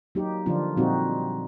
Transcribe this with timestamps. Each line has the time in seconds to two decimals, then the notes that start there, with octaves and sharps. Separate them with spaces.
0.15 F#3 A#3 D#4 G4
0.46 D3 F3 A#3 D4 F4
0.77 A#2 G3 C4 D#4 F#4